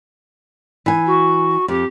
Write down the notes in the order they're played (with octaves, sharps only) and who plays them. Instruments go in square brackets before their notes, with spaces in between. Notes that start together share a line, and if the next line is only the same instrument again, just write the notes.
[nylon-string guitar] E3 G#5
[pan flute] F#4
[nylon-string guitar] F2 [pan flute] G4